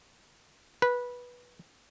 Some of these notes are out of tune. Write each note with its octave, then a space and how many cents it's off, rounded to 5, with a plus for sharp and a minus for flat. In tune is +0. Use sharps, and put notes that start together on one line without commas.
B4 -15